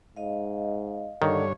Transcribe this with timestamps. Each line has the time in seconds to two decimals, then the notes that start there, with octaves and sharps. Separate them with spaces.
0.16 G#2 D#5 F5
1.22 G2 D3 D#3 C#5